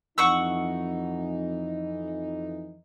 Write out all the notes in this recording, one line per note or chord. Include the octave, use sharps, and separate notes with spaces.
F2 E3 D#4 F#5 C#6 E6